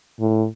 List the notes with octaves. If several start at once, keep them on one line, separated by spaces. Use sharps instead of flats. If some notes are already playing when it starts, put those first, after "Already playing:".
A2